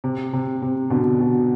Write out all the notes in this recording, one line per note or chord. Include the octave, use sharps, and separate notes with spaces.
C3
C3
C3
B2 D3
B2